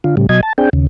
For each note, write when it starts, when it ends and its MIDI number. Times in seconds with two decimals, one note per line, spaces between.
0.04 0.15 50
0.04 0.15 65
0.17 0.27 45
0.17 0.27 49
0.17 0.27 55
0.29 0.41 47
0.29 0.41 54
0.29 0.41 75
0.29 0.41 92
0.43 0.53 81
0.58 0.70 60
0.58 0.70 62
0.58 0.70 68
0.58 0.70 79
0.73 0.87 39
0.73 0.87 49